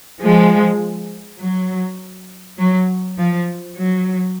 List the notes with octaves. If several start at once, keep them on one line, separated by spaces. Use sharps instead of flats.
F3 G#3
F#3
F#3
F3
F#3